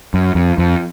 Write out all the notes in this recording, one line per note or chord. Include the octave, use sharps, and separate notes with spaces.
F#2
F2
F2